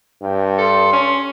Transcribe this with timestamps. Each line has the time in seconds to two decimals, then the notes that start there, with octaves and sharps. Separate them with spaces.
0.22 G2 G5
0.59 A4 C6
0.93 C#4